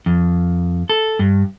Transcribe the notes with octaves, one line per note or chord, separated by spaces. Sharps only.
F2
A4
G2